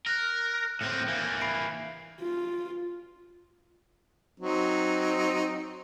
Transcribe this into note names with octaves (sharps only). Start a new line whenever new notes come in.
A#4 F6 F#6
A2 C4 G6 A#6 C#7
E3 A#3
B5 C7 D7
F4
F#3 C4 D#4